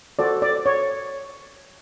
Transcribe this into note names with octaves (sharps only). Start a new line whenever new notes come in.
F#4 A4 C5 D5
D5
C#5